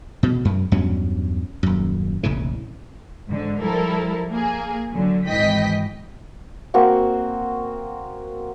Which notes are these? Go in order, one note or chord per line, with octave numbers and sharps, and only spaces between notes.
B2
F#2
E2 G2 F#3 C#4
D#1 F#2
F1 A#1 C#3 E3
G#2 D3
F3 G3 E4 A4 A#4
A#3 G#4
D3 F#3
G#1 G#2 E3 D#5 G5 B6
A#3 C4 F#4 F#5